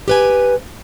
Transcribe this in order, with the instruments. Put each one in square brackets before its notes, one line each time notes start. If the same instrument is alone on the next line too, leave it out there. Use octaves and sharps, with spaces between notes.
[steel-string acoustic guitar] G4 B4 G#5